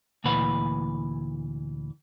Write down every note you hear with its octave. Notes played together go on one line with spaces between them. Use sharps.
D2 A#2 E3 B4 F#5